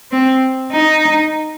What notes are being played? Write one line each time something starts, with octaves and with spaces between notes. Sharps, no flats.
C4
D#4